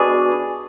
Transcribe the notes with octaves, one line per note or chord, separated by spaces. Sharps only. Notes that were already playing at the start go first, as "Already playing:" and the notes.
Already playing: B2 G#3 D4 G#4